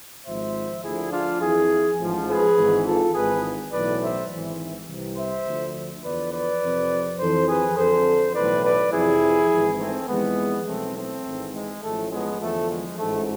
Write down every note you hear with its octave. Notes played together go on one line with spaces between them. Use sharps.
G#1 G#2 F3 C5 E5
D2 D3 F3 E4 G#4
D4 F4
F2 E3 E4 G#4
A1 G#2 F3
G#4 B4
G#1 G#2 E3
F4 A4
G#1 G#2 E3 G#4 B4
B1 A2 E3 B4 D5
C5 E5
G#1 G#2 E3
C2 C3 E3
C5 E5
D2 D3 F3
E2 D3 F3 B4 D5
B4 D5
F2 C3 F3
F2 E3 A4 C5
G#4 B4
F2 D3 F3 A4 C5
B1 A2 E3 B4 D5
B4 D5
F2 C3 E3 E4 G#4
G#1 G#2 E3
A3 C4
F2 E3 G#3 B3
B1 A2 E3 A3 C4
A3 C4
G#1 G#2 E3
G#3
A1 A2 F3 A3
G#3 B3
E2 D3 F3 A3
G#3
A1 G#2 F3 A3